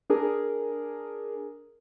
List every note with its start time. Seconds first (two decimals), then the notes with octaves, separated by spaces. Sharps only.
0.10 D4 G#4 A#4